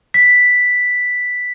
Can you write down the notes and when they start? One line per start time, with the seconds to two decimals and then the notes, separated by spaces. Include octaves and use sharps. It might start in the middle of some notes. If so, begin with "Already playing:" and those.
0.14 B6